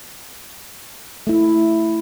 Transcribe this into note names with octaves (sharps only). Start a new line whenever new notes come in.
A3 E4